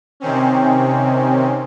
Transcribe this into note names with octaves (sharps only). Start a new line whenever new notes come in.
C3 D#3 C4 C#4